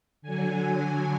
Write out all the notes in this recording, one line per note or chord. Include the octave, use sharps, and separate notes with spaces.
D3 F#3 G#5